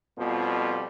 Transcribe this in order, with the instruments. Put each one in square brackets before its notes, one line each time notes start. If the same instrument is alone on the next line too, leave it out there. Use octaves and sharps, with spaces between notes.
[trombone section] F2 B2 F3 G3